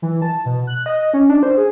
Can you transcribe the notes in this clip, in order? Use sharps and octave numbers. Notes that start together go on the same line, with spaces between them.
E3
A5
B2
F#6
D#5
C#4
D4
C5
G#4